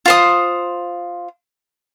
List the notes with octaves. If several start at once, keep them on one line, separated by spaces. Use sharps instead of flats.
F4 C5 D#6